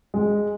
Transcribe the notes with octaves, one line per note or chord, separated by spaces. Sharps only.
G#3